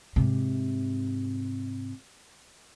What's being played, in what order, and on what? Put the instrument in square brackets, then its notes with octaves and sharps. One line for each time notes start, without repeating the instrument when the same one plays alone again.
[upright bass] G#2 C3